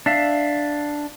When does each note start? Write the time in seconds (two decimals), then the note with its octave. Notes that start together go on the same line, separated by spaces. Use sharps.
0.06 D4 E5 F5